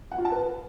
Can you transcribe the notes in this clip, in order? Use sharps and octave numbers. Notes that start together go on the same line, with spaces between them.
F#5
F4
A5
B4